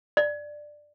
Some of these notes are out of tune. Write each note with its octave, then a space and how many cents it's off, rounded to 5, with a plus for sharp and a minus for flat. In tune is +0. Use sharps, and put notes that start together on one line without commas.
D5 +10